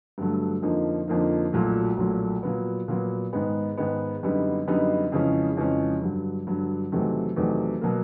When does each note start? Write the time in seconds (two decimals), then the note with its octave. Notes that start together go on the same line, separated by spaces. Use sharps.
0.18 G2 D3 F#3 A3
0.62 F2 D3 F3 A#3 D#4
1.08 F2 D3 F3 A#3 D#4
1.52 B1 A#2 F#3 A3
1.97 B1 A#2 F#3 A3
2.43 A#2 F#3 B3
2.88 A#2 F#3 B3
3.33 G#2 D#3 G#3 B3
3.77 G#2 D#3 G#3 B3
4.23 F#2 D3 G3 B3 D#4
4.67 F#2 D3 G3 B3 D#4
5.12 F2 C#3 E3 G#3 C#4
5.57 F2 C#3 E3 G#3 C#4
6.02 G2 D3 F#3
6.47 G2 D3 F#3
6.92 E2 C3 D#3 F#3 A3
7.36 E2 C3 D#3 F#3 A3
7.81 B2 F#3 A#3